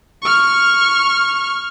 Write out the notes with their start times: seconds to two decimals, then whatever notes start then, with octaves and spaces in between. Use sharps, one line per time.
0.22 C#6 F6